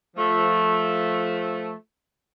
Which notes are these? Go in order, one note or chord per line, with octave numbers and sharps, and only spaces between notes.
F3 A3